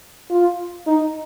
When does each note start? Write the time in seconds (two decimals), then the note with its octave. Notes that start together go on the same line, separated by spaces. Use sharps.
0.30 F4
0.87 D#4